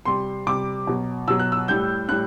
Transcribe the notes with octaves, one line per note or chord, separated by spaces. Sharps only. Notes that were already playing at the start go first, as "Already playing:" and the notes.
C3 G3 C6
C3 G3 D6
B2 F#3
B2 F#3 E6
F#6
E6
A2 G3 G6
A2 G3 F#6